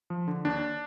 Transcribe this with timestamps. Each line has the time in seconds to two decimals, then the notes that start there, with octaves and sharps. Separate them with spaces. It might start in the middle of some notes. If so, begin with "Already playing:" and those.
0.10 F3
0.28 D3
0.45 D#2 D4